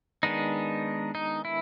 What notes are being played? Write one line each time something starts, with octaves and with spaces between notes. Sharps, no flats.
D#3 G#3 B3 D4 D#4
D#4
E4